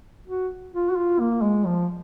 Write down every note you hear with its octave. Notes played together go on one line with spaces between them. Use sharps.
F#4
F4
F#4
F4
A#3
G#3
F3